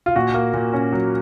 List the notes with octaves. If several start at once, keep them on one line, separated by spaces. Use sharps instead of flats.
F4
A#2 F#4
A#3
A#2
C#4
F#3